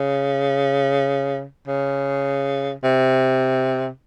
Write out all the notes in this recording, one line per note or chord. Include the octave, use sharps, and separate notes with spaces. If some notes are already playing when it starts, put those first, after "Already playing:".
Already playing: C#3
C#3
C3